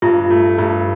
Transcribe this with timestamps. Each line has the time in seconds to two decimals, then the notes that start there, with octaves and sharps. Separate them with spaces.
0.02 G2 F4
0.30 A3
0.58 G2